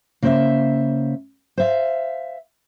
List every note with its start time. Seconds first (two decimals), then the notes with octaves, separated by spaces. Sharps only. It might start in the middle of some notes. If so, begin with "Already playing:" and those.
0.22 C#3 A#3 C5 D5 E5
1.58 C5 E5 F5